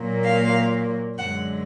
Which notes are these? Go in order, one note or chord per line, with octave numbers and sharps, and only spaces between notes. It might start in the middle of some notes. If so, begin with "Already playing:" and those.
Already playing: A#2 F#3 A#3
F5
F#2 D3 G#3 F#5